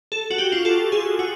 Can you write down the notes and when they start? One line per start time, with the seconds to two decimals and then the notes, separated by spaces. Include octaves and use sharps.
0.12 A4
0.30 F#4
0.38 G4
0.52 F4
0.65 A4
0.92 G#4
1.19 F#4